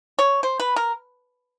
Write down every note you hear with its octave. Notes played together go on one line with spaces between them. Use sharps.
C#5
C5
B4
A#4